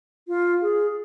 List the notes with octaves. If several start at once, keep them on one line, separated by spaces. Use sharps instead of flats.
F4
G#4